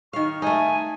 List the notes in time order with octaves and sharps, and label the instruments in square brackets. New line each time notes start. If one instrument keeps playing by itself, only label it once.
[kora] D#3 F5 [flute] C#6
[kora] A3 D#4 [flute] G#5